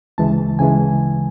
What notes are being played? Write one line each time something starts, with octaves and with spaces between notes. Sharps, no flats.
D2 C#3 E3 G#3 A5
C#3 E3 G#3 G#5